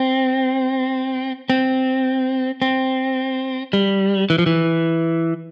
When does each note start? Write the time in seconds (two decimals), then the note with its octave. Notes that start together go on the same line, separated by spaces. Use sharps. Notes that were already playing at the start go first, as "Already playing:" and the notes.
Already playing: C4
1.50 C4
2.62 C4
3.73 G3
4.30 E3
4.38 F3
4.46 E3